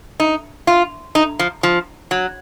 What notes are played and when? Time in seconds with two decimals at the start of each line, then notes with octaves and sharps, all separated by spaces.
0.20 D#4
0.67 F4
1.15 D#4
1.39 F3
1.63 F3
2.11 F#3